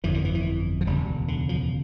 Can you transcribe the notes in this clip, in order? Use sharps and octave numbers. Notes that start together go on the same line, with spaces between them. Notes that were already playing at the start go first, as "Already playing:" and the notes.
G1 F2 D3 E3
D3
E3
E3
F3
E1 D2 C#3 G3
D3
F3